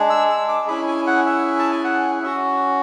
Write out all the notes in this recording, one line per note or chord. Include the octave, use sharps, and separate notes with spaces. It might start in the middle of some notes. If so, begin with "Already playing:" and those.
Already playing: G#3 D4 G#4
E6
E6
D6
C#4 E4 G#4 B5
G#5
F#5
E5
A5
G#5
F#5
C#4 F#4 E5